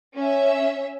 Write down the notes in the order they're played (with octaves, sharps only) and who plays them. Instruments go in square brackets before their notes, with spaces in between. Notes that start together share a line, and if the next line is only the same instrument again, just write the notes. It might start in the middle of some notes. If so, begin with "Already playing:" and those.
[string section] C#4 E5